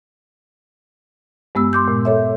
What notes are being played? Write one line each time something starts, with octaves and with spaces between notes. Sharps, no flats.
G2 G#3 B3 E6
C6 D6 G6
A#2
A4 C#5 E5